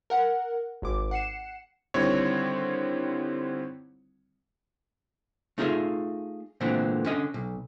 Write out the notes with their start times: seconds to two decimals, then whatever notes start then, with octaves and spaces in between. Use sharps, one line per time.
0.10 A#4 F#5
0.82 G#1 D6
1.11 F#5 C7 C#7 E7
1.94 D3 D#3 G3 C4 E4 C#5
5.58 A3 D#4 F4 G#4 D5 E5
6.61 A#2 D3 E3 G#3 A3 C4
7.05 D3 C#4 D#5
7.34 B1